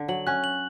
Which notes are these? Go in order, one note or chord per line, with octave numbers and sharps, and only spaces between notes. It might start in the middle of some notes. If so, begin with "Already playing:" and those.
Already playing: D3
F#3 F#7
C#4 F#6
F#7